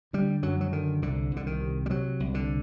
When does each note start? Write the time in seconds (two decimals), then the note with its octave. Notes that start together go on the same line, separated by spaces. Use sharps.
0.13 D3 G3
0.43 F#2 F#3
0.61 F#3
0.72 D3 D#3
1.02 C2 D3
1.32 C2 D3
1.47 D#3
1.61 C3
1.86 G3
1.90 C3 F#3
2.20 C2
2.34 D3